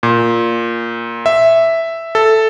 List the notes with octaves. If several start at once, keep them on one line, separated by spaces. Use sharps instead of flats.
A#2
E5
A4